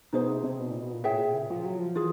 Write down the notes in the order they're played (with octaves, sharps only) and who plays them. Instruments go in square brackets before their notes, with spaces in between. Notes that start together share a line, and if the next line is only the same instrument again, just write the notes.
[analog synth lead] B2 [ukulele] D#4 G#4 C5
[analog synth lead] C3
C3
B2
A#2
B2
A#2
[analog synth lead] A2 [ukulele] G#4 C#5 E5 G5
[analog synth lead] A#2
C#3
F3
F#3
F3
[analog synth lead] E3 [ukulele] F4 G#4